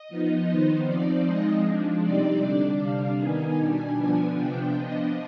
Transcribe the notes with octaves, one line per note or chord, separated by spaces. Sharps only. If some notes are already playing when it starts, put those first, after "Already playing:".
Already playing: D#5
F3 B3 D#4
D#3 B3 D#4 C5
F3 C4 D#4 D5
F3 G#3 C4 D#4 D#5
F3 G#3 D4
C3 G3 C4 D#4 D5
D3 G3 D4
C3 G3 D4 F5
D#3 B3 D#4 G#5
B2 G3 D4 G#5
D3 F3 B3 D4
C3 F3 B3 D4 G5
F3 B3 D4 D#5